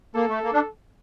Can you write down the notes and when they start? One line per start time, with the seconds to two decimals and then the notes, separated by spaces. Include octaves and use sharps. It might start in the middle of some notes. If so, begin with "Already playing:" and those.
0.15 A#3 A4
0.29 A3
0.44 A#3
0.53 D4